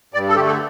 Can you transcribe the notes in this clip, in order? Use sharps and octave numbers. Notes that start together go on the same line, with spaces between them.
G2 D5
A4
D3 A3 G4
A4